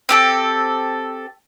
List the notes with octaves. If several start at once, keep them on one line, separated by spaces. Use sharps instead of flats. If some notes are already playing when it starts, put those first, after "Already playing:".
C4 G4 A4